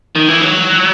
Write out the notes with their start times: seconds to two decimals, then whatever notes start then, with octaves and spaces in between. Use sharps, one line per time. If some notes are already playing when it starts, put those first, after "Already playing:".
0.16 D#3
0.29 E3
0.41 F#3